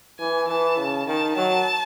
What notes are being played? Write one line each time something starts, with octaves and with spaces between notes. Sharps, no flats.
E3 G#5
E3 A5
C#3
D#3 A5
F#3 A5